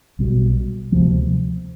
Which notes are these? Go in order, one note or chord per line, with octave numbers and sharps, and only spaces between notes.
B1 B2 G3
D2 C3 F3